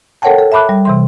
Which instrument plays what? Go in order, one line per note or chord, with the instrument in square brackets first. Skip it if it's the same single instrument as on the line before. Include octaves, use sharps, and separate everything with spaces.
[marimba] A4 A#4 C#5 F#5 G5 A5
A4
E5 A5 B5 D6 F#6
G3
C3 E3 C6